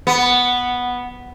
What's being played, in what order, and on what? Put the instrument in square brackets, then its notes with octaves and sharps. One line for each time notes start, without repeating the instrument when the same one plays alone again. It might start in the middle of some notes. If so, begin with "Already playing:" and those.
[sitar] B3